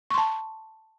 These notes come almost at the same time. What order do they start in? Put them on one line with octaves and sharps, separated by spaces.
C#6 C6 A5